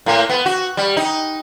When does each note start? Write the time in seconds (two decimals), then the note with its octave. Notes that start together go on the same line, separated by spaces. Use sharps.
0.06 A2 A#3
0.29 B3
0.46 F#4
0.77 G3
0.97 D#4